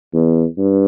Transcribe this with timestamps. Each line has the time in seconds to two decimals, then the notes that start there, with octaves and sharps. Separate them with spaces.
0.14 E2
0.58 G2